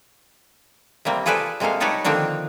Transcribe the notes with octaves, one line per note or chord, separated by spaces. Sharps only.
C3 G3 A#3 C4
F4 G#4 A4 B4 C5 D5
C3 G#3 A#3 A4 F5
G3 D#4 A4 B4 C#5 D5
D3 D#3 F3 A#3 C4 D4